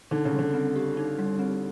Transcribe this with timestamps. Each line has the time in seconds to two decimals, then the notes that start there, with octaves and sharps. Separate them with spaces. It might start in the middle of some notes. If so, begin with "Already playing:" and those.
0.11 D3 D#4
0.25 C#3
0.33 G3
0.39 D3
0.54 C4
0.76 G4
0.97 D#4
1.19 G3
1.39 C4